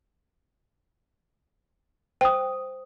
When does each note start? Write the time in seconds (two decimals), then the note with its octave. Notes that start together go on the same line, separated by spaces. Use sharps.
2.21 C5 G5 D#6